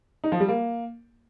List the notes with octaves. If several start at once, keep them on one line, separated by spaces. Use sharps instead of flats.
D#4
F3
G3
A#3